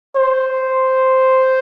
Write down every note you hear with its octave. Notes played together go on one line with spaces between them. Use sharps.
C5